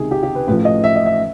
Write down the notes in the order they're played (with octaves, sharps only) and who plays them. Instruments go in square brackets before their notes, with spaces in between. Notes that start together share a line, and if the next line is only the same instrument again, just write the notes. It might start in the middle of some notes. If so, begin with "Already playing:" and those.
Already playing: [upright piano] C#2 C3 D#3 G#4
G4
G4
B4
A1 A2 F3 B4
D#5
E5
D#5
E5